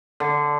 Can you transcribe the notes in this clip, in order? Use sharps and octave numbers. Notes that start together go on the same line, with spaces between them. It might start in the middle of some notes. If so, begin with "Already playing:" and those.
D3